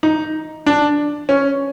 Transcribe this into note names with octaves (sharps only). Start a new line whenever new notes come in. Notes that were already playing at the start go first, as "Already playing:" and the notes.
D#4
D4
C#4